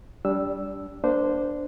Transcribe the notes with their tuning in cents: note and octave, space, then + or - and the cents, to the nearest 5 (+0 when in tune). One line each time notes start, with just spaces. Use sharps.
G3 -5 D4 -30 E6 +0
A#3 +30 D4 +0 C5 -15